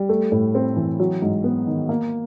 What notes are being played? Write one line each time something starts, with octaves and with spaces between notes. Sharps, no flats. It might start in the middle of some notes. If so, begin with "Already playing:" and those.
Already playing: G3
A3
A2
C4
E3
F#3
G#2
B3
D#3
A#3